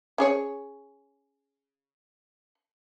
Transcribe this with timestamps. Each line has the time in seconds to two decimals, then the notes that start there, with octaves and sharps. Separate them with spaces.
0.18 C#4 G#4 C#5